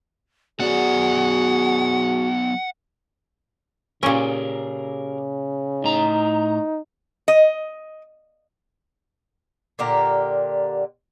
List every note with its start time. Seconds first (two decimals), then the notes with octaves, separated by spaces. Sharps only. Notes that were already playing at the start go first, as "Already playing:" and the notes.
0.60 F#3 B3 F#4 G#4 D5 F#5
4.03 A#2 C#3 C#4 G4 G#4 A#4
5.84 A2 D#4 A#5
7.28 D#5
9.79 A#2 D3 G4 A#4